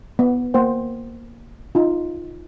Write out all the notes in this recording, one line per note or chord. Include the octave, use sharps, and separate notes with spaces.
B3
A#3 C5 F#5 G5
D#4 F4